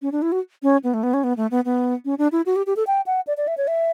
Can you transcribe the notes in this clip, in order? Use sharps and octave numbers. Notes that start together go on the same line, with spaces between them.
C#4
D4
E4
F#4
C#4
B3
A3
B3
C#4
B3
A3
B3
B3
C#4
D4
E4
F#4
G4
G4
A4
G5
F#5
D5
D5
E5
C#5
E5